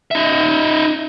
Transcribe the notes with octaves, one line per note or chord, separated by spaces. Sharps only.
D#4 E5